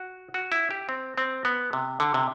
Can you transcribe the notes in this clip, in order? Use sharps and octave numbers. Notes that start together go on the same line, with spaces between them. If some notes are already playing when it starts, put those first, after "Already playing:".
Already playing: F#4
F#4
E4
G4
C4
C4
B3
C3
D3
C3